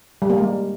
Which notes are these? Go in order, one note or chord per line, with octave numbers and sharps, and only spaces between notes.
G3
A#3
G#3